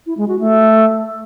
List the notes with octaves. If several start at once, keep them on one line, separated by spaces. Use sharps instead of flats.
E4
G#3
F#4
A3